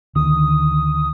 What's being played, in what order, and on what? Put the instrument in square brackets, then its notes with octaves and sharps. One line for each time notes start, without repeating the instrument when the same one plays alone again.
[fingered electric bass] D2 D3 D#3 [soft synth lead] D#6